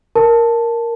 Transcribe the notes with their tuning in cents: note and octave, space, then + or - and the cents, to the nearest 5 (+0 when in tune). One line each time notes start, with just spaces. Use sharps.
A#4 +0 A5 +0